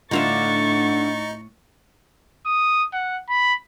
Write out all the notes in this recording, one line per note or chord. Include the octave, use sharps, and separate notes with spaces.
A2 D3 D#4 F4 E5 C#6 A6
D#6
F#5
B5